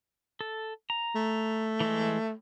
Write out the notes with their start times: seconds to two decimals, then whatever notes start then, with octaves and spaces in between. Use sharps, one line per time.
0.41 A4
0.90 A#5
1.15 A3
1.80 E3 G#3